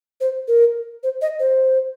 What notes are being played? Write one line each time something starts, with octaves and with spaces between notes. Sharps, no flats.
C5
A#4
C5
D#5
C5